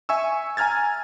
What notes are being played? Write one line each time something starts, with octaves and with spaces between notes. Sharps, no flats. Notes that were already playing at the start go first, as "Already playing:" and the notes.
E5 G#5 C#6 E6
G#5 A#5 F6 G#6 A6